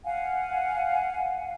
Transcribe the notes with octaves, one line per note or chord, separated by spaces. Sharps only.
F5 F#5 G#5